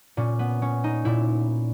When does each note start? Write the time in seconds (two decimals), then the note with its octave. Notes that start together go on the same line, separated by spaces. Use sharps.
0.17 A#2 C#4
0.39 B3
0.62 C#4
0.84 D#4
1.05 A#2 E4